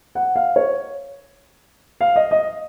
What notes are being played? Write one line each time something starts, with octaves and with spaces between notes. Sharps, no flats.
F#5
F5
C#5
F5
D#5
D#5